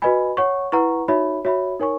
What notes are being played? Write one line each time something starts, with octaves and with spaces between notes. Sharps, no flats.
F#4 B4 D#5 G#5 B5
C#5 F#5 C#6
E4 B4 F#5 A#5 C#6
D#4 F#4 C#5 E5 B5
F#4 C#5 E5 B5
D#4 A#4 C#5 G#5 C#6